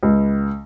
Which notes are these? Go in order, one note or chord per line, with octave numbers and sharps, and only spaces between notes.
C#2